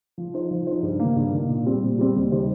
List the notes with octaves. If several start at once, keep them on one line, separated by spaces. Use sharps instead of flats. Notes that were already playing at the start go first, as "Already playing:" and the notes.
F3
D#4 C5
F3
D#4 C5
G2
A#3
D#3
G2
D#3 A#3
A#2
G3 C4
A#2
G3 C4
D#2
D#3 G3 D#4 C5